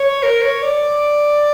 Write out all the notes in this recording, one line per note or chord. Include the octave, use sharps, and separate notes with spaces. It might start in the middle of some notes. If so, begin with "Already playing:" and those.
Already playing: C#5
A#4
C#5
D5